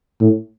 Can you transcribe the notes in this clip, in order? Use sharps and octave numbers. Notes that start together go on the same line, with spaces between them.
A2